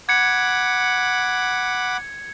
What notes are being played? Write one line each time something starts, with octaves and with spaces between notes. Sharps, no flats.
F#5 B5 D6 G#6 C#7